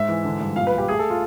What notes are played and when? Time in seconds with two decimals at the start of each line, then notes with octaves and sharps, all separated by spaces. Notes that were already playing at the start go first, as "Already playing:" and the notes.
Already playing: G#2 E5
0.09 E3
0.24 D3
0.41 G2
0.56 A#2 F5
0.67 B4
0.73 B1
0.78 G4
0.88 A3 G#4
0.99 A4
1.10 F4